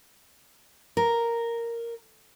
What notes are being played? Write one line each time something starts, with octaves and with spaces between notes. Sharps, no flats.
A#4